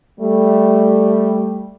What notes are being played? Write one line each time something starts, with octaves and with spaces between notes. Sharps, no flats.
G3 A3